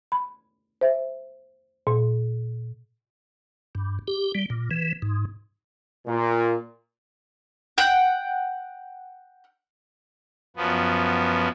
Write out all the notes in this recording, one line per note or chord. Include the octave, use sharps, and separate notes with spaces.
B5
C5 E5
A#2
G2
G4
G3
A#2
E3
G#2
A#2
F#5 G5
F#2 F3 B3